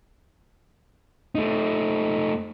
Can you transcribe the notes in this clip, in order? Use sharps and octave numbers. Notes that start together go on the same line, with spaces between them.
A3 D#4